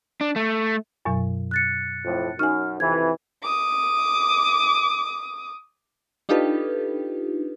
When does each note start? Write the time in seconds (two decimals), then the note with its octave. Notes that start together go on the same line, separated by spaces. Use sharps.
0.21 D4
0.36 A3
1.05 F#2 B2 F#3
1.51 F#6 A6 C#7
2.05 F2 A2
2.39 F#2 D#4 G#5 F6
2.80 F2 C3 E3 G#6
3.43 D6 D#6
6.29 D4 D#4 F4 G4 A4 B4